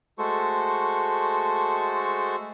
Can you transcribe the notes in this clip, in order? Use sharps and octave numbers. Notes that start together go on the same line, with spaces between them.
G#3 A3 F#4 A4 C5 C#6